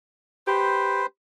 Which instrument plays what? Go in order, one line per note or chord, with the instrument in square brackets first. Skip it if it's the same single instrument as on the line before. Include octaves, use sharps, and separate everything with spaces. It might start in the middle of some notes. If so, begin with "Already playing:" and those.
[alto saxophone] G4 [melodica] B4 C5